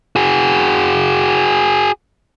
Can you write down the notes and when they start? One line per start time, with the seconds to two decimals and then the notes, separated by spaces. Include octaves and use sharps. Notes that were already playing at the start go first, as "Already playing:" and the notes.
0.16 F#4 G#4